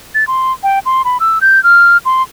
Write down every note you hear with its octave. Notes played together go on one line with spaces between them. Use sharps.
A6
C6
G5
C6
B5
E6
G6
F6
C6